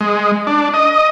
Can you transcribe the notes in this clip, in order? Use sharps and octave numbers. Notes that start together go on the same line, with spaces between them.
G#3
D4
D#5